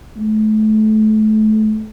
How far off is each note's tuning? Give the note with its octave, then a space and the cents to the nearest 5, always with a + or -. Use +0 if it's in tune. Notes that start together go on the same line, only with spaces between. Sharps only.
A3 -30